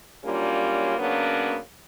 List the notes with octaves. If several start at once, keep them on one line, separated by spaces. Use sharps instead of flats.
F#3 G3 A#3 C#4 D4 F4
C#3 F#3 A#3 B3 C#4 D4